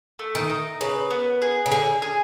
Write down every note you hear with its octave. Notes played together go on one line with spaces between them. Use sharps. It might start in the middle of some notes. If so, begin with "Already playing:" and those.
A3
D#3
D#4
C#3 B4
B3
G#4
C#3
D3 G#4
G#4